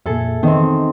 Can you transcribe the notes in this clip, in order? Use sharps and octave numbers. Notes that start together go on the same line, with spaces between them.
F2 A#2 G#4 A4 E5
D#3 B3 C4 D#5